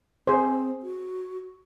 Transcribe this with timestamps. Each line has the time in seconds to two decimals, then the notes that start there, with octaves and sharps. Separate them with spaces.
0.27 C4 G#4 C5
0.83 F#4